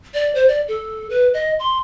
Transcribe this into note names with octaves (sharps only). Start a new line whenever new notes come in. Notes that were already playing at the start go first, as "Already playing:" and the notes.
D5
C5
D5
A4
B4
D#5
C6